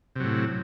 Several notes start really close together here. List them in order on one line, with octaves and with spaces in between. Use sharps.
C3 F#3 A2